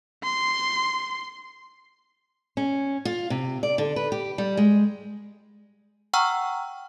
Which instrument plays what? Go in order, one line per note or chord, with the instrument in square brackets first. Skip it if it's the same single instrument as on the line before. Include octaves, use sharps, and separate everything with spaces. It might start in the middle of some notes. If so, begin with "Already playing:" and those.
[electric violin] C6
[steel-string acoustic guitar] C#4
F4
C3
D5
D3
B4
G4
G3
G#3
[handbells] F#5 G5 A#5 C#6 E6 F6